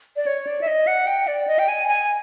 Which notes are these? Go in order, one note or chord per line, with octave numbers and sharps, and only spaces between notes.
D5
C#5
D5
E5
D#5
F#5
G5
D5
D#5
G5
G#5
G#5